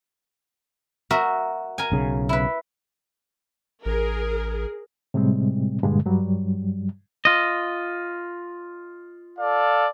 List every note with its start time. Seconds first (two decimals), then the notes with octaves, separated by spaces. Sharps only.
1.11 F#4 A#4 E5
1.78 A#4 G#5
1.92 B1 C#3
2.29 E4 B4
3.86 A1 G#4 A#4
5.14 A2 C3 G3 G#3 C4
5.83 G2 A#2 D3 G#3
6.06 G2 F#3 G3
7.25 F4 D#5
9.39 A4 D5 F5